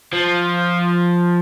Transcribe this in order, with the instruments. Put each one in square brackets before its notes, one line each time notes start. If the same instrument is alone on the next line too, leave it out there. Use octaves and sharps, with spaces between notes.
[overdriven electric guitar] F3